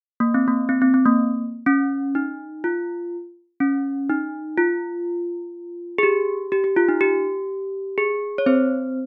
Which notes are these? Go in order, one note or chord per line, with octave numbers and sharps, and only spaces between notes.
A#3
C4
A#3
C4
C4
C4
A#3
C#4
D#4
F4
C#4
D#4
F4
G#4
G4
G4
G4
F4
D#4
G4
G#4
C#5
C4 C5